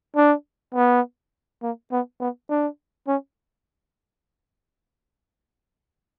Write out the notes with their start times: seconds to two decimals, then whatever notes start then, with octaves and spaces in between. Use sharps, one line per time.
0.16 D4
0.75 B3
1.62 A#3
1.92 B3
2.20 B3
2.50 D4
3.08 C#4